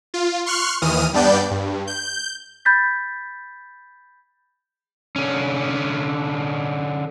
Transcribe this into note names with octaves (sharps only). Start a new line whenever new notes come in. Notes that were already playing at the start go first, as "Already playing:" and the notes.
F4
C6 C#6 F6 F#6
D#2 E3 D#6 F6 D#7
G2 G3 B3 D4 D5 G6
G2
G6
B5 G6 A6 B6
D3 C#4